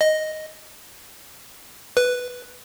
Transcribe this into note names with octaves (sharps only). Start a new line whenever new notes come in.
D#5
B4